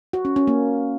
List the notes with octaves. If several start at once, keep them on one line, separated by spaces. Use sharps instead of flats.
F#4
C#4
C#4
A#3